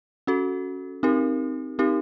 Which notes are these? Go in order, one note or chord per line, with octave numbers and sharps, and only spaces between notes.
C#4 F#4 A4
C4 D#4 G4 A#4
C4 D#4 G4 A#4